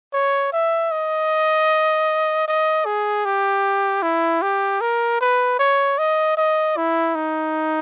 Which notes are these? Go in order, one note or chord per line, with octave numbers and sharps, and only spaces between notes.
C#5
E5
D#5
D#5
G#4
G4
E4
G4
A#4
B4
C#5
D#5
D#5
E4
D#4